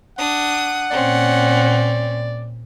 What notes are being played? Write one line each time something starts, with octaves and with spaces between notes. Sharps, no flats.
D4 F#5 D#6
A#2 C4 C#4 D5